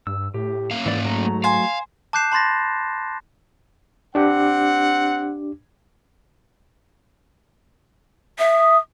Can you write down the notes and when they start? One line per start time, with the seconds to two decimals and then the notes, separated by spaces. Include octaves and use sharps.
0.07 G2 E6
0.34 A2 G4
0.71 A#3 C#4 F5
0.86 G#2 E3 D5
1.05 F#3 A3 A#5
1.44 C5 F5 G#5
2.13 A5 D6 F#6 G6 C7 E7
2.32 A5 B5 C6 A6 A#6
4.15 C4 D4 G4 F#5 D6
8.39 E5 D#6